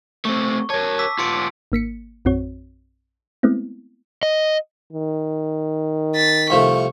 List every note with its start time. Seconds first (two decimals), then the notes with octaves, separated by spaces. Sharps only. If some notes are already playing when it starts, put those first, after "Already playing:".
0.25 A3 C4 C#6
0.70 A#4 C#5 A5
0.99 D6 E6 B6
1.19 B3 F4 C6 C#7 D7
1.72 G#1 A#3 B6 C#7
2.25 A#1 F#2 C4 F#4 C#5
3.43 G#3 A3 B3 C4 E4
4.23 D#5
4.93 D#3
6.15 A6 B6
6.50 C2 F3 A3 C#6